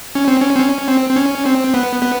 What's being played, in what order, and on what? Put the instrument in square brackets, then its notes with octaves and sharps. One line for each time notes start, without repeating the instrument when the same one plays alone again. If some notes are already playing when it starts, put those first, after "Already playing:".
[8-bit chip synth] C#4
C4
C#4
C4
C#4
C4
C4
C#4
C4
B3
B3